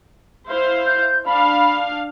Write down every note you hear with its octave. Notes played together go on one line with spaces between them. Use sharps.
E4 C5 F5
G6
D4 F5 B5